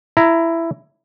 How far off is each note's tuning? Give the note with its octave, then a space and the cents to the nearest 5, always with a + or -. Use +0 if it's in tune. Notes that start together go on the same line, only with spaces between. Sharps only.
E4 +10 A#5 +0